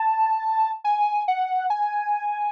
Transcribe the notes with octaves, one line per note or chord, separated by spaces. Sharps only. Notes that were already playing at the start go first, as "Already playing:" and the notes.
Already playing: A5
G#5
F#5
G#5